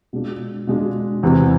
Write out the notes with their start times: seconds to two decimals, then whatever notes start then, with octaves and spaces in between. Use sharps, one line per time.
0.13 B2 G#3 D4 F4
0.67 B2 G#3 D4 F4
1.23 E2 C3 E3 B3